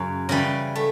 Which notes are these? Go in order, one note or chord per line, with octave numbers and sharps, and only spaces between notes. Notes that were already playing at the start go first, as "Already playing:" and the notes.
Already playing: F#2 C#3
C#3 E3 G3
A3